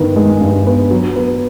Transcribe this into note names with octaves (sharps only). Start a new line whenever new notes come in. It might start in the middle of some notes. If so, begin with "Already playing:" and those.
Already playing: G2 D#3 B3
G#3
G2
B3
F#3
B3